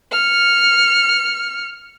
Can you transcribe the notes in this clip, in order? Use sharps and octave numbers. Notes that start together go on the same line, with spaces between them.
F6 C#7